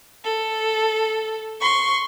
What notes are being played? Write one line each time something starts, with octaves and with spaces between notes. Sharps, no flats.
A4
C6 C#6